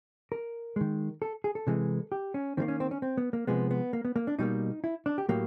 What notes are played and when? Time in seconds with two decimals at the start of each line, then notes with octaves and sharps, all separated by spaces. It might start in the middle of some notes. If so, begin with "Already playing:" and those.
0.32 A#4
0.76 D#3 G#3
1.22 A4
1.44 G#4
1.55 A4
1.67 C3 E3 G#3
2.12 G4
2.34 C#4
2.57 D#3 G3 A#3 C4
2.68 C#4
2.80 C4
2.91 C#4
3.02 C4
3.17 B3
3.33 A#3
3.47 C3 F3 G#3 B3
3.71 B3
3.93 A#3
4.05 B3
4.16 A#3
4.27 D4
4.39 B2 G3 A#3 D#4
4.84 E4
5.06 D4
5.18 G4
5.29 A2 F#3 A#3 G4